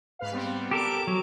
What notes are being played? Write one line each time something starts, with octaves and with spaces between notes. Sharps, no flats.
G#2 B4 F5
G3 B3 C4
G4 A4 A#4 D6
F#3